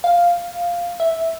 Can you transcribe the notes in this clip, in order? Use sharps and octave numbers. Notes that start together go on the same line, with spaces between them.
F5
E5